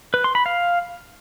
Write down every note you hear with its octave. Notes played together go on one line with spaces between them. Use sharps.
B4
C6
B5
F5